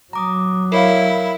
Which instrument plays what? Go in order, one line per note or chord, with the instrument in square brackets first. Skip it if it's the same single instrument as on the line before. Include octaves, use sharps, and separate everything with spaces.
[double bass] F#3 [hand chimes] A#5 D6 D#6
[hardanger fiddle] E4 [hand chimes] A#4 C#5 F5